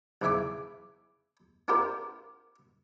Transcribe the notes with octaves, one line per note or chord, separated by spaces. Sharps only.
B1 E2 C#3 E5 G#5 D6
B3 C4 D4 F4 G4 A#4